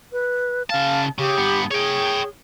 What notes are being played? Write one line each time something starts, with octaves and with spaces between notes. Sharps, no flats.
B4
C#3 F5 A5
C#3 G4
G2 B3
G#4 C#5 G5